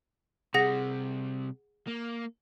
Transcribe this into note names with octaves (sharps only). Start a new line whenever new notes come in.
C3 G3 G#4 F#5 A#6
A#3